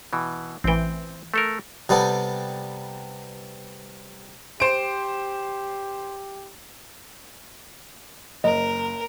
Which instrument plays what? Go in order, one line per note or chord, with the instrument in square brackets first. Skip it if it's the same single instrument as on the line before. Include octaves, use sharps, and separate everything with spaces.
[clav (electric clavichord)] B2 E3
[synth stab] A1 E3 [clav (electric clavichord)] C4 G5
[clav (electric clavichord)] A3 A4 A#4
[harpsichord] C3 G3 B3 A4
[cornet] G4 [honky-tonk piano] C5 D7
[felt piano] F#1 [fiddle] A#4 [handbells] D#5